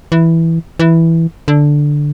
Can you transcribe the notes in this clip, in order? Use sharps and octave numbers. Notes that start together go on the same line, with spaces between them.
E3
E3
D3